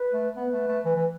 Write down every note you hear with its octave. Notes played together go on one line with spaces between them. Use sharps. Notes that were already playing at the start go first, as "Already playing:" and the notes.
Already playing: B4
A3
B3 B4
A3
A3
E3 B4
E3